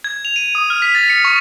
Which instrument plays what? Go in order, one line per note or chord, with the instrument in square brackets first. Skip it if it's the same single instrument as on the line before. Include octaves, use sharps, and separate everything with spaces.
[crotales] G#6
F7
D#7
D#6
F6
B6
A6
C#7
C#6